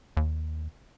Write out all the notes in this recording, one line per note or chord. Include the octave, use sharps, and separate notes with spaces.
D#2